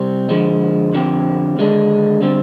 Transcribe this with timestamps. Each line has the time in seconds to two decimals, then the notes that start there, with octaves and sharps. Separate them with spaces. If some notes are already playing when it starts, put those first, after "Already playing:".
Already playing: C3 G3 C4
0.29 D3 F3 G#3
0.93 F2 D3 F3 C4 G4
1.57 D#2 D3 G#3 D4
2.22 D3 G3 C4